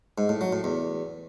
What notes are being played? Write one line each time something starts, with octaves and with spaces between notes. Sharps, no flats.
G#2
A2
F#3
A2
E2